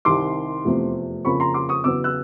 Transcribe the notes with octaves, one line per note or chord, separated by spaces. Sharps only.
C2 C3 D#3 C6 D6
F1 E2 C3 F3 A3
F2 C#3 F3 A#3 B5 C#6
A#5 C6
C6 D6
C#6 D#6
E2 C#3 F#3 B3 D6 E6
E6 F#6